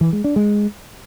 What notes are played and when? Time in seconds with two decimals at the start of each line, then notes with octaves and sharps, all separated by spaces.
0.01 E3
0.13 G#3
0.24 D4
0.36 G#3